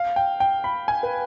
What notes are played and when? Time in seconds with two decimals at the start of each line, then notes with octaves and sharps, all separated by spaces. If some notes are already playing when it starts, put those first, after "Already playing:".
Already playing: F5
0.16 G5
0.40 G5
0.64 B5
0.88 G#5
1.03 B4